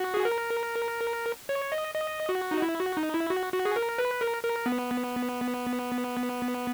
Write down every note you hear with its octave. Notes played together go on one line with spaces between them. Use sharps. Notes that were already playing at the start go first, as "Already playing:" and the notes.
Already playing: F#4
G#4
A#4
C#5
D#5
D#5
F#4
D#4
E4
F#4
D#4
E4
F#4
F#4
G#4
A#4
B4
A#4
A#4
B3